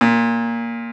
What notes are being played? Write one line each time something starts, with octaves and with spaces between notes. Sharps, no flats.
A#2